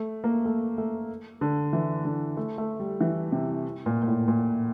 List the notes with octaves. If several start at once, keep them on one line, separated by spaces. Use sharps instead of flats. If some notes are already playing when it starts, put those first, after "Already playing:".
Already playing: A3
A#3
A3
A3
D3
E3
D3
A3
A3
G3
E3
C3
A#2
A#2
A2
A#2